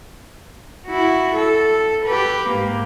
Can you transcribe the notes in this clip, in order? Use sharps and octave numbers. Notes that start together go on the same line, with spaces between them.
E4 F#4
A4
G4 B4
G#2 A#3